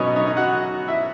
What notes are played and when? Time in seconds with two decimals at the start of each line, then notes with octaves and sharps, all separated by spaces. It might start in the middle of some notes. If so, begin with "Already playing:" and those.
Already playing: B2 F#3 B3 C#4 D#4 C#5 D#5
0.16 D#4 D#5
0.26 D#4 D#5
0.37 F#4 F#5
0.88 E4 E5